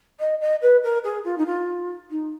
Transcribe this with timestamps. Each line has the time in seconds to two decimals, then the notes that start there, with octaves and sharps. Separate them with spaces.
0.20 D#5
0.41 D#5
0.62 B4
0.83 A#4
1.04 G#4
1.25 F4
1.38 D#4
1.46 F4
2.10 D#4